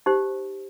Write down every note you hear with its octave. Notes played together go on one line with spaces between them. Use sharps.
D#4 G4 C5